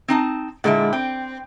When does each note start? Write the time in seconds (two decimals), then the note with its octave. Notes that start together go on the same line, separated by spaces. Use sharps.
0.08 C4 D#4 A5
0.64 A#2 D3 G#3 E4 F#5
0.93 C4 G5